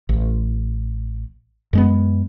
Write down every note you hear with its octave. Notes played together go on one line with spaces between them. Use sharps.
A1
F#2 G#3 B3